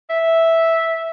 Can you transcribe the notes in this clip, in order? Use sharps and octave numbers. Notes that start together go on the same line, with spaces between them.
E5